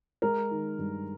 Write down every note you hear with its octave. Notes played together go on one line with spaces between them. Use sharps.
G#3 A#4
D#3
G2